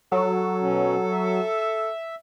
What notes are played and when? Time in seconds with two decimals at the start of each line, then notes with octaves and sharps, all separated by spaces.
0.12 F#3 A4
0.60 B2 C#4
1.10 E5